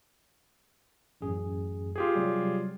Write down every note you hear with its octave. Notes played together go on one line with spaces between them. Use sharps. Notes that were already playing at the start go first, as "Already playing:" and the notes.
A1 F#2 G#4
F4 G4 G#4
C3 F#3 G3